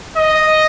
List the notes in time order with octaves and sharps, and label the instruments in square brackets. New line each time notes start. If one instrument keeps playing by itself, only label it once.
[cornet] D#5